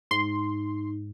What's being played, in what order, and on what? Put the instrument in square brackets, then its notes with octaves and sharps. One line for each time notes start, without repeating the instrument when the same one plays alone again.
[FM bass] G#2 [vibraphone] D#4 [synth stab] C6